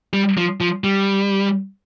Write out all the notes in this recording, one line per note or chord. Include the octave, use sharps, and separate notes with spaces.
G3
F3
F3
G3